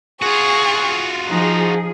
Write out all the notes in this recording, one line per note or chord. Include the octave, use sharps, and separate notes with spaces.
F4 F#4 G#4 C#6
F3 D#4 G#4